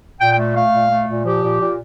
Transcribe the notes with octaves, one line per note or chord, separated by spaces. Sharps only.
A#2 G5
G5
A3
A3 F5
A#2
A3
A#2
F3 G4
A#2
A#2